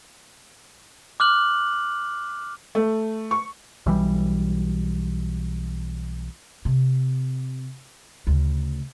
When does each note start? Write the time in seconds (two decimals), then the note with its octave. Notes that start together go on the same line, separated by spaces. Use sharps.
1.20 D6 F6 F#6 F#7
2.75 A3
3.31 C#6
3.86 B1 E3 G3
6.65 C3
8.27 D2 C#3